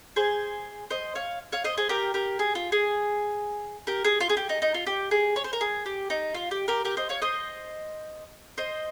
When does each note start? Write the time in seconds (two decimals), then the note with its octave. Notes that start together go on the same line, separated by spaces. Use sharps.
0.16 G#4 C5
0.91 C5 D#5
1.15 C#5 F5
1.52 C#5 F5
1.64 C5 D#5
1.78 G#4 C5
1.89 G4 A#4
2.14 G4 A#4
2.39 G#4
2.55 F4
2.72 G#4
3.87 G4 A#4
4.04 G#4
4.20 F4
4.30 G#4
4.37 G4
4.49 D#4
4.62 D#4
4.74 F4
4.87 G4
5.11 G#4
5.36 C#5
5.44 C5
5.53 A#4
5.61 G#4
5.86 G4
6.10 D#4
6.34 F4
6.51 G4
6.68 G4 A#4
6.85 G4 A#4
6.97 C5 D#5
7.09 C#5 F5
7.22 C5 D#5
8.58 C5 D#5